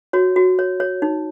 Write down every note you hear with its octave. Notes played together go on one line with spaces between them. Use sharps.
F#4 C#5
F#4
C#5
C#5
D#4